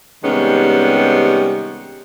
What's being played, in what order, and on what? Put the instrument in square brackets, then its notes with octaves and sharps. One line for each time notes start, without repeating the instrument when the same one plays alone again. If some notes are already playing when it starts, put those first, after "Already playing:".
[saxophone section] C3 D#3 G3 G#3 B3 C#4